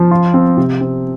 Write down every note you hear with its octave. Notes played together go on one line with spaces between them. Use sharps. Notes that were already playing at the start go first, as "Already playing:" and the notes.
Already playing: F3
F4
C4
C3
C4